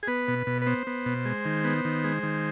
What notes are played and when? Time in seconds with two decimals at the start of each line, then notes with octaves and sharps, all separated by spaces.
0.03 G#4
0.07 B3 B4
0.28 B2
0.47 B2
0.62 B4
0.66 B3 C5
0.87 B3
1.06 B2
1.25 G#3
1.45 D#3
1.64 B3
1.85 D#3
2.04 G#3
2.23 D#3